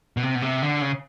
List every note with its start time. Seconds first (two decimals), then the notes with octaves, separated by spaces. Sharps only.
0.17 B2
0.23 C3
0.35 B2
0.42 C3
0.62 D3
0.82 C#3